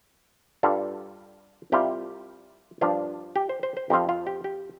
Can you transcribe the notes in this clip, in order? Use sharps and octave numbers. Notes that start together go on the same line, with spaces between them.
G2 G3 D4 F4 A4
C2 C3 G3 F4 G4
G2 F3 D4 F4
G4
C5
C5
C5
F2 F3 C4 F4 G4
F4
G4
G4